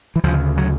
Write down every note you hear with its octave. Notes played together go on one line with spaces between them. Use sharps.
E3
D2 C#3 F3
F#3